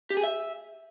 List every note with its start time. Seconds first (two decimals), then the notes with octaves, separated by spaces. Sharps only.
0.10 G4
0.17 G#4
0.23 E5